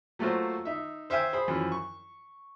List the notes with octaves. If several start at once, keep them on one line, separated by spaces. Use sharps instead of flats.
F#3 A3 A#3 F4 F#4 C5
D#4 E5
C5 E5 F5 G5 G#5
G#4 C5 B5
F#2 E3 F3
C#6